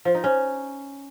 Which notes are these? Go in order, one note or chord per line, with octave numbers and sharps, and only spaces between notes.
F3
D#4
C#4